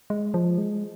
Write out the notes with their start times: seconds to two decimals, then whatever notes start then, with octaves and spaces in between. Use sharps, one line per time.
0.10 G#3
0.34 F3
0.58 G#3